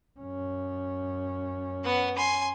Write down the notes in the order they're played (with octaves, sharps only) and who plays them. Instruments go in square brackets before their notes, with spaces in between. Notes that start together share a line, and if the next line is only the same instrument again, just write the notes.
[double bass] F#2 C#4
[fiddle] B3 F#5
G#5 C6